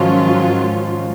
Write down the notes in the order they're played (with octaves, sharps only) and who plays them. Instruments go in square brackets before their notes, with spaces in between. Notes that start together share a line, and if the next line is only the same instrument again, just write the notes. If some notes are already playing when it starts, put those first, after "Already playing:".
Already playing: [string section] G#2 D#3 F#3 C#4 F4 [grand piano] F3